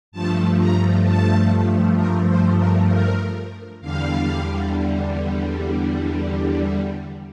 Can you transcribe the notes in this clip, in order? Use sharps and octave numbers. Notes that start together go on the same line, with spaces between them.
G2 F3 A3 A5
A#5
A5
A#4
C5
A#4
A#4
E2 D3 G3 F5